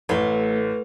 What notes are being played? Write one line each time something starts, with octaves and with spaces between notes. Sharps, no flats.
A1 A3 B4